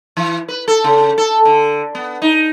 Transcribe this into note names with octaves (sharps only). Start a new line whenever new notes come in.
E3
B4
A4
C#3
A4
D3
B3
D#4